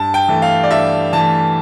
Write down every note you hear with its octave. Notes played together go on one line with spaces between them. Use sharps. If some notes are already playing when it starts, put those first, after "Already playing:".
Already playing: G2 A5
G5
E3 A3
F5
D5
G2 E5
E3 A3 A5